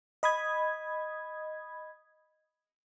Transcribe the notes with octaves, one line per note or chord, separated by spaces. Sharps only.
D#5 B5 D#6 G#6